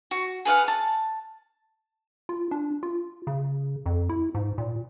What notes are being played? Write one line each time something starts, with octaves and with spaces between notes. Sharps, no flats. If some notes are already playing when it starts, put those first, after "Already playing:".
F#4
G#4 B4 F5 F#5
A5
F4
D4
F4
C#3
F2
E4
G#2
A#2